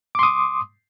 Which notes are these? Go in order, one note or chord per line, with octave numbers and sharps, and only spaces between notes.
C6 D6 D#6